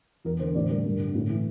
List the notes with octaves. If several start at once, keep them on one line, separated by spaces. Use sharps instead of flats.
E2 A#4
D3 C5
A2 D5
G3 A#4
G2
D3
A2
E3